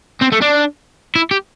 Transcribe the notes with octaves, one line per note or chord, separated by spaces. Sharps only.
C4
A3
D4
E4
G4